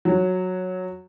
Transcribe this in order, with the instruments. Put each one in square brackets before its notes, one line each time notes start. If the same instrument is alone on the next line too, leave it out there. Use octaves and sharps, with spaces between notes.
[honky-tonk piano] F#3